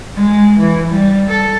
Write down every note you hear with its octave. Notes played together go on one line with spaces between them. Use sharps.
G#3
E3
G3
A4